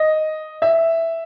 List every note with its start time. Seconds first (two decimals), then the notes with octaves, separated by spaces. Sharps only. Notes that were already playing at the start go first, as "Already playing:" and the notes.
Already playing: D#5
0.62 E5